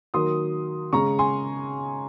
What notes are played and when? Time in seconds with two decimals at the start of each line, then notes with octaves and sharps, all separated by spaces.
0.14 D#3 F#3 A#3 C6 D#6
0.93 C#3 G#3 A#5 C#6
1.19 G#5 C6